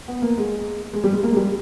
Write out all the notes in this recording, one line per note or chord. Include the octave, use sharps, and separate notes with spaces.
B3
A#3
G#3
G#3
G3
G#3
A#3
G#3
G3